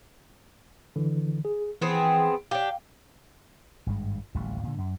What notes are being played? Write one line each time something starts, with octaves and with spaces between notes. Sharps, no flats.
D3 E3
G#4
E3 B3 C4 G#4
D4 G4 F5 G5
G#1 G2 G#3
D1 A1 D#2 G3
A#2 D3
F#2